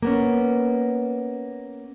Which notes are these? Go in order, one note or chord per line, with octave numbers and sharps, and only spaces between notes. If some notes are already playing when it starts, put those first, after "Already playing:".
A#3 B3 C#4